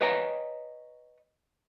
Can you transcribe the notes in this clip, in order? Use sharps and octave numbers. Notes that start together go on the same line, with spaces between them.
B4 C#5 D#5 G5 G#5 A#5